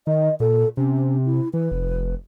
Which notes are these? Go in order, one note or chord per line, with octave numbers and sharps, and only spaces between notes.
D#3 D#5
A#2 A4
C3 C#4
E4
E3 B4
F1